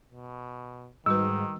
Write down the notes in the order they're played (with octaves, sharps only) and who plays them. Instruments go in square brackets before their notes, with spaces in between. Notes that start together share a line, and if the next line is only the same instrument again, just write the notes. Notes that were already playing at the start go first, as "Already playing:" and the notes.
[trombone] B2
[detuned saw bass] G#2 [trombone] D#3 [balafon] G3 F#4 B4 [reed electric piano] E6